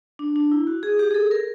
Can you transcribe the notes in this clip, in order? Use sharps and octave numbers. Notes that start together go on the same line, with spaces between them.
D4
D4
E4
F#4
G#4
G4
G#4
A4
A#4